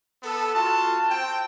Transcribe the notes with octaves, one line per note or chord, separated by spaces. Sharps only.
B3 A4
F4 F#4 A5
C4 G5